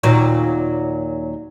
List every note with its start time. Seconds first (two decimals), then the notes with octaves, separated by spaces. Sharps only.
0.03 D#2 A#2 F#3